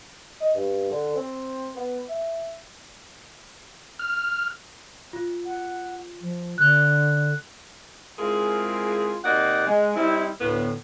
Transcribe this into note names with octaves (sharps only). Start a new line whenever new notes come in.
D#5
G2
D3
C4
B3
E5
F6
F4
F#5
F3
D3 F#6
G#3 C4 E4 F4 G#4 A#4
C3 A#3 D#4 D5 F#5
G#3
G3 C4 D#4 E4
D2 A2 B3